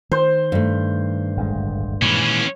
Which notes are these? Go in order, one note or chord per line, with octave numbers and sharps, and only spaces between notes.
D#3 C5
G2 A3
D1 G#1 G#3
A#2 D#3 E3 G#3 C#4